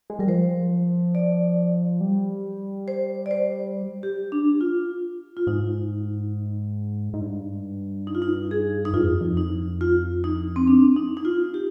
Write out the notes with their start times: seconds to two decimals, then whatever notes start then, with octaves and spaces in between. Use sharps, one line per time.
0.10 G#3
0.19 G3 A#4
0.27 F3 C5
1.15 D5
2.01 G3
2.88 C5
3.26 D5
3.31 C5
4.03 G4
4.32 D4
4.61 F4
5.37 F4
5.47 G#2 D#4
7.13 G#2
7.21 G2
8.07 D#4
8.15 F4
8.22 D#4
8.51 G#4
8.85 D#4
8.93 G2 F4
9.03 F2
9.21 F2
9.37 D#4
9.81 F4
10.24 D#4
10.56 C4
10.68 D4
10.96 D#4
11.17 D#4
11.25 F4
11.54 G4